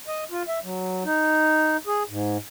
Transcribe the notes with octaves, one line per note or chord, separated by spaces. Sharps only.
D#5
F4
E5
F#3
D#4
G#4
G#2